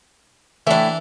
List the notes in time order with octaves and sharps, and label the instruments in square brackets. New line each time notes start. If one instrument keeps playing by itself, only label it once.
[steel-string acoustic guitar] A2 A3 [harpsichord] E3 D4